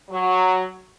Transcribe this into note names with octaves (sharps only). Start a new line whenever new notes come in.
F#3